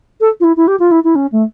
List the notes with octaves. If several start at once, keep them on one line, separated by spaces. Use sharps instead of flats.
A4
F4
E4
E4
G4
F4
E4
E4
C#4
A3